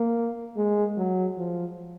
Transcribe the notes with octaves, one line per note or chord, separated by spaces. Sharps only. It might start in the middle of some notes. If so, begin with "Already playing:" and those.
Already playing: A#3
G#3
F#3
F3